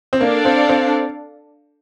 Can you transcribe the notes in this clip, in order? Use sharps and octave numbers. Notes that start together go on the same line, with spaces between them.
C4
A#3 D4 A4 D5 F5
C4
C4